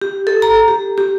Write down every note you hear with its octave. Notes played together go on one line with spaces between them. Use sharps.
G4
A4
A#5
G4
G4